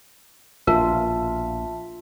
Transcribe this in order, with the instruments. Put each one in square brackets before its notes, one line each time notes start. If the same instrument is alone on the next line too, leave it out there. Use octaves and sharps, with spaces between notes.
[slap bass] A#1 B2 [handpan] F4 [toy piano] A#4 [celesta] E5 A5 B6